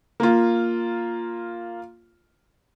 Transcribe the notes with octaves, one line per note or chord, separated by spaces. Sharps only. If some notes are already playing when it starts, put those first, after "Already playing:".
A#3 F4